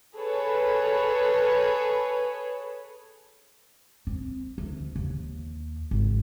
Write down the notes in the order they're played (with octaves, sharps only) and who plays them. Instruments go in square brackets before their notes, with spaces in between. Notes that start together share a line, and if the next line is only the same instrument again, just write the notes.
[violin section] G#4 A4 B4 C#5
[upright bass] C4
D2
D#2
G#1